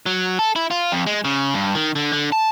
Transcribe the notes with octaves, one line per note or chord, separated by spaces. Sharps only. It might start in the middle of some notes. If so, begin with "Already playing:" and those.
F#3
A4
E4
F4
F2
G#3
C#3
G2
D#3
D3
D3
A5